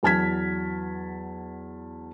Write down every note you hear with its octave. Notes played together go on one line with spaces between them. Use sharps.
E2 F#3 A5 F6 G#6 B6